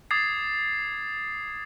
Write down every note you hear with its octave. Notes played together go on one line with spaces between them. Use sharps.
D6 D#6 G#6 A6 C7